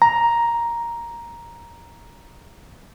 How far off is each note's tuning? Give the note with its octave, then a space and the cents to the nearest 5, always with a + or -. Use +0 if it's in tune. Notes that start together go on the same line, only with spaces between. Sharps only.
A#5 +5